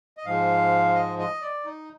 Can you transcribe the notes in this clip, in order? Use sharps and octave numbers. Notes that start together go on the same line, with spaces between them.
D#5
G#2 F3 G#3 F5
D#5
D#5
D5
D#4